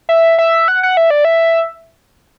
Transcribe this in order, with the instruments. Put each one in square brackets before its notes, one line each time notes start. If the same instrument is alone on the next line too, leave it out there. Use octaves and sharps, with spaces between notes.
[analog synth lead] E5
E5
F#5
F#5
E5
D5
E5